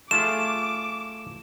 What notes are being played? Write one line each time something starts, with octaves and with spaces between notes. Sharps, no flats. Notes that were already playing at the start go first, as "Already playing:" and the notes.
A3 F4 G#4 D6 E7